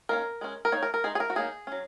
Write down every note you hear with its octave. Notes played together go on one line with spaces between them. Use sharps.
D#3 A#3 C#4 A#4
G#3 C#4
A#4
D#3 A#3 D#4 C#5
A#4
A#4
D#3 G#3 D#4 G#4
G#4
A#4
F#4
F#3 A#3 D#4 G#4
F#3 C#4